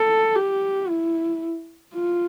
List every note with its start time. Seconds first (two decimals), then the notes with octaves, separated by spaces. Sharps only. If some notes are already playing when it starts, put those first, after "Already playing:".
Already playing: A4
0.36 G4
0.89 E4
1.95 F4